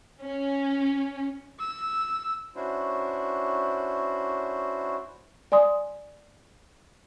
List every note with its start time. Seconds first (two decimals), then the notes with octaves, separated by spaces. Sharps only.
0.22 C#4
1.59 E6
2.56 C#4 D4 E4 F#4 C5
5.52 D5 G#5 C6 D#6